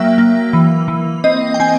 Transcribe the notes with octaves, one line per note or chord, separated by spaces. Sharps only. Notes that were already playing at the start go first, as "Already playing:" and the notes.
Already playing: F#3 A#3 E5 G5
A#3
E3
E3
C4 D#5
G5
C4 G#5